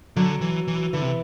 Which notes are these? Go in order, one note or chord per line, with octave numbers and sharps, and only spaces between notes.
D3 F#3
E3
E3
D3 E3
C3